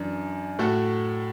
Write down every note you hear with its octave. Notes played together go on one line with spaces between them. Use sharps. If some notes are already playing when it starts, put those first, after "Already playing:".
Already playing: F#2 E3 D4
A2 A3 F#4 A4